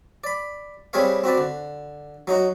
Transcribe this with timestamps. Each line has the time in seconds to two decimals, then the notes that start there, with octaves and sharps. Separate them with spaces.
0.24 D5 B5
0.93 G3 C4 G#4 B4 C#5 F5
1.24 C4 F#4 B4 D5
1.37 D3
2.27 F#3 D#4 F#4 F#5